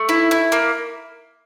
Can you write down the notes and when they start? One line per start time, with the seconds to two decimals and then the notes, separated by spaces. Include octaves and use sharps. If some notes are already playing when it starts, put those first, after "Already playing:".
Already playing: A3
0.09 E4
0.31 E4
0.52 A#3